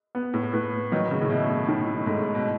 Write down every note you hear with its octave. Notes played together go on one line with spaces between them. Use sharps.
B3
A2
A2 B4
D#3 F#3
C#3
A2
B2 E4
A2
A2 D#3
G#2 A3
B2